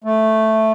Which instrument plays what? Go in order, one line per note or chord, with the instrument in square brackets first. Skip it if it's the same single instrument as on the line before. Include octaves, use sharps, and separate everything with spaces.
[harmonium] A3